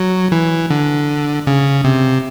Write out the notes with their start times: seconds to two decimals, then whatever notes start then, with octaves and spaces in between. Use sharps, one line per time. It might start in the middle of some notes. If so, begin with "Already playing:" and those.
Already playing: F#3
0.32 E3
0.70 D3
1.47 C#3
1.84 C3